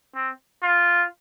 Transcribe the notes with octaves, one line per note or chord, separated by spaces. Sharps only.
C4
F4